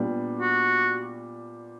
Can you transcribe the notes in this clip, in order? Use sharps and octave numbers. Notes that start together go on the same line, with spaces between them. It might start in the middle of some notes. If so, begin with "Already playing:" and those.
Already playing: A#2 G3 B3 D4 G4
F#4